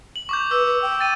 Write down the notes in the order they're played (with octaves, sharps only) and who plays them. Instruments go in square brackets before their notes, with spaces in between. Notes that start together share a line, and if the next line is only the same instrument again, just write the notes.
[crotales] F#7
C#6 D6 G6
[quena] B4 [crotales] D6 E6
[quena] B4
G5
[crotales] A6 D#7